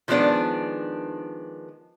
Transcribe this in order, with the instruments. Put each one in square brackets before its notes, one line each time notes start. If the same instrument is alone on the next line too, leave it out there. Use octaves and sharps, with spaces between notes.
[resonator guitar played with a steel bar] D#3 F3 G#3 B3 D4 D5